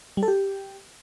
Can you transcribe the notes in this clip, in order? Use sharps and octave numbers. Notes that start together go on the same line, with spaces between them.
G3
A4
G4